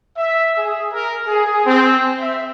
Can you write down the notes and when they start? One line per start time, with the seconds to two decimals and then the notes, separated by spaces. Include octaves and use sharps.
0.17 E5
0.57 G#4
0.93 A#4
1.27 G#4
1.65 C4
2.19 E5